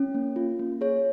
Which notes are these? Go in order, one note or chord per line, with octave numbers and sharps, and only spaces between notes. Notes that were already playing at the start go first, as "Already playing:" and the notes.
Already playing: C#4
A#3
F4
A#3
G#4 C#5